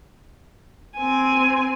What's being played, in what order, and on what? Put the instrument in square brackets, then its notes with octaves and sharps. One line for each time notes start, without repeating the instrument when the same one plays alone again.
[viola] C4 G#5